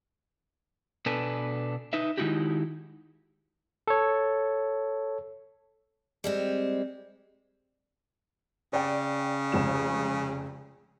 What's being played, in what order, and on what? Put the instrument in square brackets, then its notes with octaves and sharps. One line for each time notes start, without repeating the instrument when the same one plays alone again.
[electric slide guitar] B2 B3 D4 A4 B4 G#5
D#4 B4 E5
D#3 G#3 D#4 E4 F#4 G4
[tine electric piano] A4 C#5
[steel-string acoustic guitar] G3 G#3 C4
[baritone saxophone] C#3 [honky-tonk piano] D5 G5
[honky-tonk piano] F1 C#2 E7